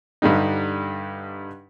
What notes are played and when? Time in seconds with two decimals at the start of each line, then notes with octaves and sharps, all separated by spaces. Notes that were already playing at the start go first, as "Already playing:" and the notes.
0.22 G2 D3 G3 D#4